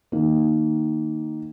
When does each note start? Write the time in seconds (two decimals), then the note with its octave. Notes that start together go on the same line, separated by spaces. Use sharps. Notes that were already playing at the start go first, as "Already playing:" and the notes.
0.12 D#3 A#3